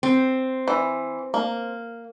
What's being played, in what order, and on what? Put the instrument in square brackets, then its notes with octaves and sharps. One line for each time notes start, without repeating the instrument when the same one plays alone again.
[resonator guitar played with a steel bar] C4
[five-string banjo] E3
A#3